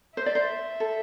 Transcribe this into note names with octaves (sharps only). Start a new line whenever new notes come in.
C5 E5
D5
C5
A4